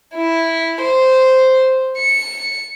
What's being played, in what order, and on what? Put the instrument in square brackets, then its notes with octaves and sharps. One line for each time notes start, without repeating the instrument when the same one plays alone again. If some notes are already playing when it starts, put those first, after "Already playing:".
[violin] E4
C5
C#7